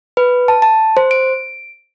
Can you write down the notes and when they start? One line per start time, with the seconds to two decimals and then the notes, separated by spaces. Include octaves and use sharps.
0.17 B4
0.48 A5
0.62 A5
0.97 C5
1.11 D7